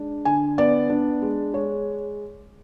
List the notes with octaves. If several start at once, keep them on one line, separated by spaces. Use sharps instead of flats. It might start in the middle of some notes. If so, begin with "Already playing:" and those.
Already playing: G#3 D4
D3 G#5
B3 D5
D4
G#3
G#3 C#5